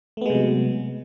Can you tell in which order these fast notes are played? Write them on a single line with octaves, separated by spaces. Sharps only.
A3 B3 G#3 C3 F#3